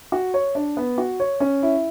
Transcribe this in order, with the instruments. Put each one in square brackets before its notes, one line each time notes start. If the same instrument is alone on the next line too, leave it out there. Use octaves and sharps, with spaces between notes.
[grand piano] F#4
C#5
D4
B3
F#4
C#5
C#4
E4